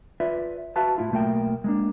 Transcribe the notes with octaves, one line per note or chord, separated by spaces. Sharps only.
F4 B4 D5 E5
F#4 B4 E5 F5 A5
A2 E4 F4
B1 A3 A#3 F#5 G5
G#3 A#3 D4